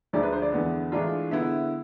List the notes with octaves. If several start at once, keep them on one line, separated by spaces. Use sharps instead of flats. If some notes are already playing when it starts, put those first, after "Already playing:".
D2 D3 F3 G#3 D5
B4
C5
D5
E2 D3 G#3 B3
A2 E3 G#3 D4 F4
D3 G#3 B3 E4 E5